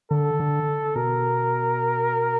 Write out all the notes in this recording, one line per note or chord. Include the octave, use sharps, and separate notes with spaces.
D3 A4
D3
B2 A#4